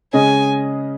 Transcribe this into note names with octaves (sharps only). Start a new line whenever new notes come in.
C#3 G#3 C#4 G#4 D#5 G#5